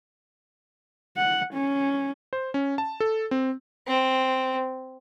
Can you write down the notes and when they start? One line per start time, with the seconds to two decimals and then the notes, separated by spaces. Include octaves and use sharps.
1.17 F#5
1.54 C#4
2.33 C5
2.54 C#4
2.78 A5
3.00 A4
3.31 C4
3.87 C4